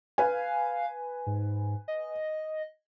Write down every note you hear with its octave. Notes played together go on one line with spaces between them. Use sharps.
B4 F5 G#5
G#2
D#5